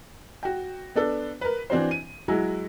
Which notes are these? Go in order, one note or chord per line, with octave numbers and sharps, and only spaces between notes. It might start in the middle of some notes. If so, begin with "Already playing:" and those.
F#4 G5
B3 D4 A4
A#4 B4
E3 C4 D4 F#4 C5
D#7
F#3 G#3 E4 F#4